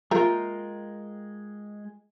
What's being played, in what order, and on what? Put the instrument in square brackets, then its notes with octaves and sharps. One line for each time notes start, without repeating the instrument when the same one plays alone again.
[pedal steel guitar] G#3 G5 G6 [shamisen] A#3 E5 A#5 [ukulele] F4 A#4